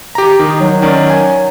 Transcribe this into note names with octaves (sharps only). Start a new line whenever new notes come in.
G4 A#5
D#3 D#4
F#3
D#3 C#4 D5
G#5